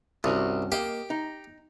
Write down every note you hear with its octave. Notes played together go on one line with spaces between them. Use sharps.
C2 G2 C#4 F#4
A#3 G4 D#5
D#4